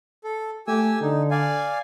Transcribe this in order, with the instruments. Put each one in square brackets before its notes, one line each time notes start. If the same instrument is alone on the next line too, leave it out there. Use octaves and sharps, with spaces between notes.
[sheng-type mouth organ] A4
[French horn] A3 [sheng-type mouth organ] G4 G#5 E6
[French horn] D3 [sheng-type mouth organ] D#4
[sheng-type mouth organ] D5 F5 G#5